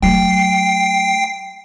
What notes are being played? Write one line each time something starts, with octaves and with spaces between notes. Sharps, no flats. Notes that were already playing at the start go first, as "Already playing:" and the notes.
F#3 A3 G5 C7